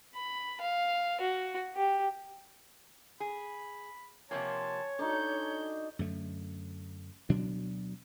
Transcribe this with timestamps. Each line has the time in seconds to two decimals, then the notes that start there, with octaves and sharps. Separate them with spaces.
0.15 B5
0.61 F5
1.20 F#4
1.75 G4
3.20 G#4 B5
4.31 C3 F3 A#3 C#5 G#5 A5 C6
4.99 D4 D#4 F#4 A4 G6
5.99 F#2 D3 A3
7.29 D2 B2 F#3 D4